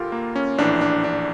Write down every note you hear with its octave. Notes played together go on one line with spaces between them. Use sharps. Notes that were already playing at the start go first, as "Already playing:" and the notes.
Already playing: D2 F4 G4 A4 A#4
A#3
C#4
A#1 A2 E3 D4
D4
D4